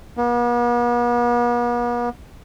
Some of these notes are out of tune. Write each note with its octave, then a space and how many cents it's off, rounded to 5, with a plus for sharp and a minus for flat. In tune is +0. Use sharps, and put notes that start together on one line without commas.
B3 -45